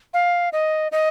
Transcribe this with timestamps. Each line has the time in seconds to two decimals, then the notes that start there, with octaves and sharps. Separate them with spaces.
0.14 F5
0.53 D#5
0.92 D#5